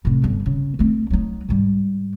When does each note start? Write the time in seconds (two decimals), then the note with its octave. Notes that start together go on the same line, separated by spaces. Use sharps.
0.05 A2 C3
0.24 G1 D3
0.46 C#3
0.79 A3 C4
1.10 F#3 D#4
1.49 G#2 G3